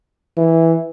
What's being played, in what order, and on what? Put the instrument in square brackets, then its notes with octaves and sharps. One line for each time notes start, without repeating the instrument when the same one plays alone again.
[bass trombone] E3